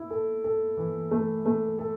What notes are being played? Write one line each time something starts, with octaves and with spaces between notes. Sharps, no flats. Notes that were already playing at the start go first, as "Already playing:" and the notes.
Already playing: E4
A4
A4
E3
A3
A3
A4